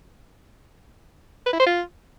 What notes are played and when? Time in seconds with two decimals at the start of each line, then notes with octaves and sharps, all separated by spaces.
1.46 B4
1.53 E4
1.60 C5
1.66 F4